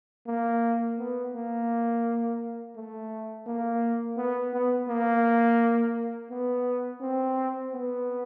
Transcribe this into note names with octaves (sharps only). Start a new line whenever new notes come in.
A#3
B3
A#3
A3
A#3
B3
B3
A#3
B3
C4
B3